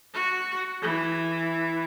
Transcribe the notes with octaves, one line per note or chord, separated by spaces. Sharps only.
F#4
E3